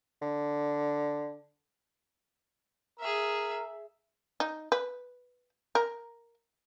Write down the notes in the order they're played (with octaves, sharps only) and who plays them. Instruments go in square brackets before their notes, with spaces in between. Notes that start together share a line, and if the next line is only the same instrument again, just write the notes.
[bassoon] D3
[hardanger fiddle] G#4 E5 [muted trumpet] A#4
[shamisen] D#4
B4
A#4